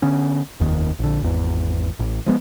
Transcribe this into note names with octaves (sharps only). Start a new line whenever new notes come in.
D3 B3 C#4
F1 D#2 D#3
A#1 D3
G#1 E2
A1
F3 G#3 B3